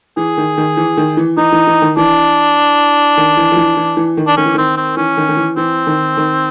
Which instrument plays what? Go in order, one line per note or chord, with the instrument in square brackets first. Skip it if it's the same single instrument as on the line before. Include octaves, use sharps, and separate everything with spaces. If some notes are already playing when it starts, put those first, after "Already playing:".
[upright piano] E3 [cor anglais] G#4
[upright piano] D#3
D#3
E3
D#3
E3
[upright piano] E3 [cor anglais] D#4
[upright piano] E3
E3
D#3
[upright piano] E3 [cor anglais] D4
[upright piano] D#3
E3
F3
E3
E3
E3
D#3
[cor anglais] D4
[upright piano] D#3 [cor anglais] C#4
[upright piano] E3
[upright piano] D#3 [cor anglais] C4
[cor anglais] C4
[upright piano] E3 [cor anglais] C#4
[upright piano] D#3
D#3
E3
[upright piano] E3 [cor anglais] C4
[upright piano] D#3
D#3